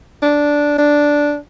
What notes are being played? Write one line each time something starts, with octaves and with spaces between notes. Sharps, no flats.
D4
D4